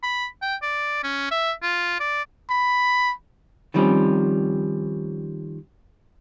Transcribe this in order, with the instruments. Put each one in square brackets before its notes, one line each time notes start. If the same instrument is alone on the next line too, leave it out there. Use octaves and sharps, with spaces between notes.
[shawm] B5
G5
D5
C#4
E5
F4
D5
[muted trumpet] B5
[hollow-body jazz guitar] D#3 F3 G3 C4 C#4